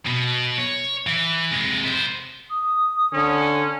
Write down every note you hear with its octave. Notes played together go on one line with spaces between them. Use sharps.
B2
C#5
E3
C3 G#3
B3 C5
D#6
D3 C#4